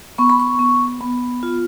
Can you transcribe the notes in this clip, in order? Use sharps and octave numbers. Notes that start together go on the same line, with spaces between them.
B3 C#6
B5
C#6
B3
B3
F4